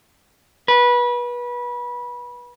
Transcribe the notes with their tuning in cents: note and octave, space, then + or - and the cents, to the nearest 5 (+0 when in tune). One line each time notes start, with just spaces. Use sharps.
B4 -25